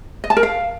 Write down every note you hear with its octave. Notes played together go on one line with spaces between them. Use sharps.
D#5
A5
A#4
F5